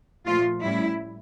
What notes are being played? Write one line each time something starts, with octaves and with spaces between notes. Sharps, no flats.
A#2 F3 A3 F4
A2 G3 C#4 E4